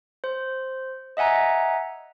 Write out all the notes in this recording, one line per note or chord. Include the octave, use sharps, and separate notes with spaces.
C5
D#5 E5 F#5 G#5 A#5